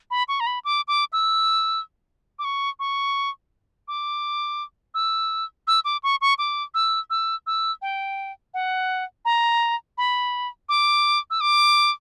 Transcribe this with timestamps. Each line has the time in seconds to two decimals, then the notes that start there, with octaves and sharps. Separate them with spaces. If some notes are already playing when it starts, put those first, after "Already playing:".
0.11 B5
0.28 C#6
0.40 A#5
0.46 B5
0.65 D6
0.88 D6
1.13 E6
2.39 D6
2.44 C#6
2.79 C#6
3.88 D6
4.94 E6
5.67 E6
5.85 D6
6.03 C#6
6.21 C#6
6.38 D6
6.74 E6
7.10 E6
7.47 E6
7.82 G5
8.54 F#5
9.25 A#5
9.98 B5
10.69 D6
11.30 E6
11.41 D6